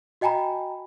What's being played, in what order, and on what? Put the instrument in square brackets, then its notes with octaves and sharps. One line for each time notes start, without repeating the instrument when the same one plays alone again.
[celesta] F#4 D#5 G5 G#5 A#5 B5